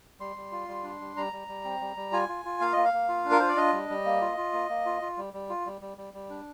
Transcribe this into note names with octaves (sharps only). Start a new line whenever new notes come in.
G3 C6
G3
F4
G3
D4
G3
G3 A#5
G3
G3
C4
G3
G3
F4 G#5
F4
F4
A#3 F5
A#3 D#5
F5
A#3
F4
D4
A#4
F4 C5
D5
D4 D#5
G3
G3
A#3
F4
F4
A#3
A#3
F4
F4
G3
G3
F4
G3
G3
G3
G3
D4